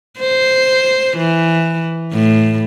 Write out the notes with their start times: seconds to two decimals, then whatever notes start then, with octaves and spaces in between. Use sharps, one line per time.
0.20 C5
1.17 E3
2.13 A2